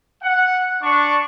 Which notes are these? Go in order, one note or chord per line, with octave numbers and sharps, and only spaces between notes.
F#5
D4 C#6